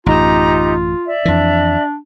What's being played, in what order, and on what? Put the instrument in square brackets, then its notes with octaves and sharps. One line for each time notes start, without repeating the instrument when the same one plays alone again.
[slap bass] A1 F#2 [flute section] D#4 G4 A#5 [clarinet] F4
[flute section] D5 E5
[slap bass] F2 E3 [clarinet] D4